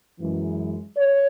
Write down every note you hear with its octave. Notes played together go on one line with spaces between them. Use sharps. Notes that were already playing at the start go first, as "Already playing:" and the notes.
F#2 E3 G#3
C#5